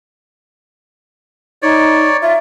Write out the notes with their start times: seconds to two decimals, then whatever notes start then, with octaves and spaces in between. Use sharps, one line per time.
1.62 D#4 C#5 D5
2.22 F4 E5